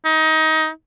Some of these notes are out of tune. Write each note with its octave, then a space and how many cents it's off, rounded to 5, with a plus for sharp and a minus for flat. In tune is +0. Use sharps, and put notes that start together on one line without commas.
D#4 +25